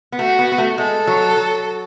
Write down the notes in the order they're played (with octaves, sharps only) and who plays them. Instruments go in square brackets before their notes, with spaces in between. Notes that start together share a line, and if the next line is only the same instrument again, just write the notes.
[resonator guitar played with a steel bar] B3
[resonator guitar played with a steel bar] A3 [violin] F#4
[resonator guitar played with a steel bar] B3
B3
A3
[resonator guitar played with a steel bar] G#3 [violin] A4
[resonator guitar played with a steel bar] F#3
F#3